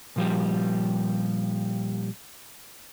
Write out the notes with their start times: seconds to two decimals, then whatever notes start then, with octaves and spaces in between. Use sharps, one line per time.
0.16 A#2 F3 G3